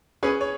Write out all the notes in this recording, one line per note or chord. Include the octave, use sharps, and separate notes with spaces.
C#4 G#4 B4
C#5